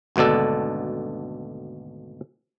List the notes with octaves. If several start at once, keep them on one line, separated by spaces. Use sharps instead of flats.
G#1 D2 B2 D4 A4